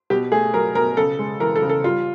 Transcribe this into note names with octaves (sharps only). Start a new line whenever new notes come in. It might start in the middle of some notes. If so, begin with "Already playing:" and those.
B2 G4
A3 G#4
F#3 A#4
B2 A#4
C#3 A4
G#3
E3 A#4
A4
C#3
A4
G3 F4